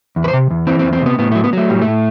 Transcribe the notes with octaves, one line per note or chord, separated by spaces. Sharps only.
E2
B4
C5
C3
E2
E3 C4
C4
E2
C4
C3 B3
A2 B3
F#3 A3
B3
F#3 A3
A2 G3
A3
A2